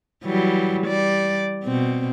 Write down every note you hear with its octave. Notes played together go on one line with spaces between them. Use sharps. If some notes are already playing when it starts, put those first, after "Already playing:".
E3 F#3 G3
G3 D5
B2 C4